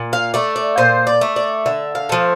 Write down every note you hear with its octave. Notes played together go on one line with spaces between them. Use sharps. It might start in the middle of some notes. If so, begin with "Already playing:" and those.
Already playing: A#2
F5
A3 D5
D5
A#2 C5
D5
A3
D5
D3 E5
F5
F3 A3